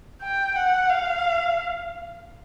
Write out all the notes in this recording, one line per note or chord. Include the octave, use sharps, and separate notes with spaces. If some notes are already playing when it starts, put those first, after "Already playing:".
G5
F#5
F5